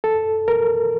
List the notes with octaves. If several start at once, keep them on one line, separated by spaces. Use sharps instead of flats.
A4
A#4